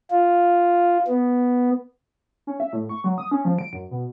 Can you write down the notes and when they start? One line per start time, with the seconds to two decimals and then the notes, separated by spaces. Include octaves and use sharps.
0.11 F4
1.08 B3
2.47 C#4
2.60 E5
2.73 A2
2.89 C#6
3.04 F#3
3.18 D#6
3.31 C#4
3.45 F3
3.59 D7
3.73 F#2
3.91 B2